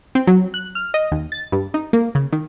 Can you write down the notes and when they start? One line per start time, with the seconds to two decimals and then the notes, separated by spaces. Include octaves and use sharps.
0.15 C4
0.27 F#3
0.54 F#6
0.75 F6
0.94 D#5
1.12 D#2
1.32 A6
1.52 G2
1.74 D#4
1.93 A#3
2.15 C#3
2.32 D#3